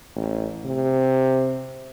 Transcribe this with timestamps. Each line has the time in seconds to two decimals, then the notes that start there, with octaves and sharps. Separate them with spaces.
0.16 A1
0.65 C3